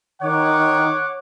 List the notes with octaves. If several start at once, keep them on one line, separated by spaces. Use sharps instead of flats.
D#3 C#5 F#5 D6